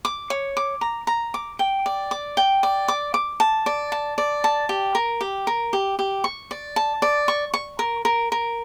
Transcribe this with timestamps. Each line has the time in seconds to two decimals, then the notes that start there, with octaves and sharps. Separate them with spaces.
0.05 D6
0.30 C#5
0.57 D6
0.81 A#5
1.07 A#5
1.34 D6
1.59 G5
1.86 D5
2.11 D6
2.37 G5
2.63 D5
2.88 D6
3.14 D6
3.40 A5
3.66 D5
3.92 A5
4.18 D5
4.44 A5
4.69 G4
4.95 A#4
5.21 G4
5.47 A#4
5.73 G4
5.99 G4
6.24 C#6
6.51 D5
6.76 A5
7.02 D5
7.28 C#6
7.54 C#6
7.79 A#4
8.05 A#4
8.32 A#4